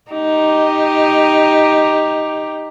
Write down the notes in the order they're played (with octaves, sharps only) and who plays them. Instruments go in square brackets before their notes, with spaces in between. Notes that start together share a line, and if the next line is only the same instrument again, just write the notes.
[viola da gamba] D#4 G4